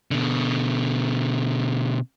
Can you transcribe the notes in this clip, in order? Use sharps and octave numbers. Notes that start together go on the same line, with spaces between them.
B2 D3